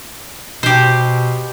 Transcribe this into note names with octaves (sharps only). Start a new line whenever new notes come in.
B2 G4 C5